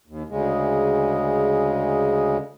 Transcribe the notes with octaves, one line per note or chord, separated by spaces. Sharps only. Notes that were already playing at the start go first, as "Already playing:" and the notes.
D#2
D2 C#3 G#3